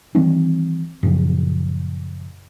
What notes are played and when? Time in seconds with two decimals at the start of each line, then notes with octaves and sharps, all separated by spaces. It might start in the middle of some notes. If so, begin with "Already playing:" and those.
0.15 D#3 E3 G3 C4
1.03 F#2 A#2 C#3 F3